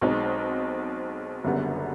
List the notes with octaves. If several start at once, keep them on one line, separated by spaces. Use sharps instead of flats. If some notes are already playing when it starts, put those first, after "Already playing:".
B1 B2 G#3 C4 D#4
F#1 F#2 D3 G3 B3